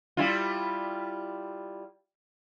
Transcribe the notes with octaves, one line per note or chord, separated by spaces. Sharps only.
G3 E4 F4